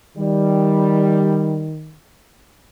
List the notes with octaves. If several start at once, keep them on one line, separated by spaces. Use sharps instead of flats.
D#3 G3